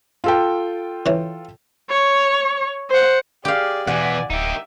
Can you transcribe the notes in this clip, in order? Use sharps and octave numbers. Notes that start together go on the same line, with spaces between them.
F4 A4 G5
E3 C#4
C#5
C5 F#5
G4 G#4 D5 F5
E2 B2 E3 D5 F#5 G#5
D1 D#4 G4 E5